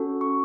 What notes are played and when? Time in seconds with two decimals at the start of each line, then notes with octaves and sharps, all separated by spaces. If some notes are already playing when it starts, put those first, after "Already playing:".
Already playing: C#4 F#4 A4
0.21 C#6